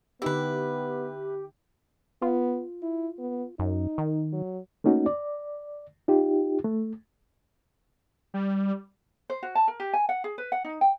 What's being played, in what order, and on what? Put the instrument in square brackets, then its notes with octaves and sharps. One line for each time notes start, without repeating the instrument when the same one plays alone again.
[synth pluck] D3 D#4 E5 [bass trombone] B3 [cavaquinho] E4 B4 [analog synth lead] G4
[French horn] B3 [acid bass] F4
[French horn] E4
B3
[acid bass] F#2 [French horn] D#4
[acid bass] D#3
[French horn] F#3
[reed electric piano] A3 A#3 C#4 D#4 F#4
D5
D#4 F4 G4
A3
[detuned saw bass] G3
[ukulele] C5
F#4
A5
A#4
G4
G#5
F#5
G#4
B4
F#5
D#4
G5